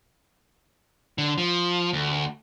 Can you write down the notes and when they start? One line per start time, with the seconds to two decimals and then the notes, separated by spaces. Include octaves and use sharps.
1.18 D3
1.38 F3
1.93 D2